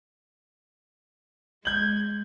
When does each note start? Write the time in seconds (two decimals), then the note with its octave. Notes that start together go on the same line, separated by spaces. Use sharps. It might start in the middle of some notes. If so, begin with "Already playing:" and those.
1.65 G#3 G6 G#6 F#7